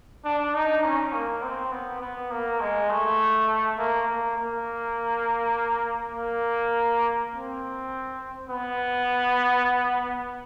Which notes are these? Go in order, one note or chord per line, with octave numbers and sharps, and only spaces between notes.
D4
D#4
C#4
A#3
C4
B3
B3
A#3
G#3
A3
A#3
A#3
A#3
A#3
C4
B3